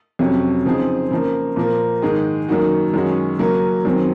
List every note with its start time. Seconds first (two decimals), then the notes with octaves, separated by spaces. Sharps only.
0.19 F2 C3 F#3 C#4
0.65 C#3 F3 C4 D#4 G#4
1.11 C#3 F3 A#3
1.56 A#2 F3 A#3
2.02 G#2 D#3 G#3 D#4 G#4
2.48 F#2 D#3 A#3 D#4 F#4
2.94 F#2 D#3 G#3 C#4 F#4
3.39 C#3 F#3 A#3 C#4
3.85 F#2 D#3 F#3 C4